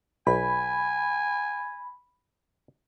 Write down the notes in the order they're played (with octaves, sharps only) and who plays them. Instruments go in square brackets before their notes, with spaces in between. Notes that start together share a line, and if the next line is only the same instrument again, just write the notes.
[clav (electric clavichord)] B1 [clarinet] G#5 [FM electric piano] B5